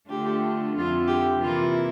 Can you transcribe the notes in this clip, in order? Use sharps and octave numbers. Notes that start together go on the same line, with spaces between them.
D3 A3 D4 F4 G4
F2 D3 F3 C4 E4 F4
G4
C3 E3 A#3 E4 F4